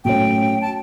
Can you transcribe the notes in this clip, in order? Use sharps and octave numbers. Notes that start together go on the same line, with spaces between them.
A2 F#3 A3 C#4 G5
A5